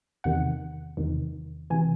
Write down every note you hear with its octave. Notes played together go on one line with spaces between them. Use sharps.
E2 C3 D#3 F#5
E2 C3 D#3
C3 E3 G#5